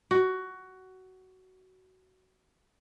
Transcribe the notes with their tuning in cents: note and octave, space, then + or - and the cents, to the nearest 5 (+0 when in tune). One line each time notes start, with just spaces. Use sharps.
F#4 +15